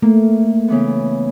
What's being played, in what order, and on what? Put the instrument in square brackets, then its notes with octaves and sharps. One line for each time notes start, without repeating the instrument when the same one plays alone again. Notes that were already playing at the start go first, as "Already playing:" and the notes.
[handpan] A3 [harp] A#3
[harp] C#3 E3 B3